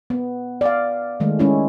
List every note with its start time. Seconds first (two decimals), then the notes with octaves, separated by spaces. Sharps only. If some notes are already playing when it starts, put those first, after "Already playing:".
0.10 B3
0.61 D5 F5
1.20 D#3 G#3 A3
1.39 G#3 C#4 E4